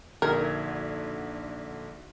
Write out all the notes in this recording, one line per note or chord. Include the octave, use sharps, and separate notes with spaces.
A#1 D3 D#4 F#4 A#4 G#6